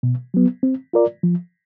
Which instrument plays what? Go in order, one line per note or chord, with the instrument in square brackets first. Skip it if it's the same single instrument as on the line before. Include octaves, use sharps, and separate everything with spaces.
[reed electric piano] B2
F#3 B3
C4
F4 A#4 D5
F3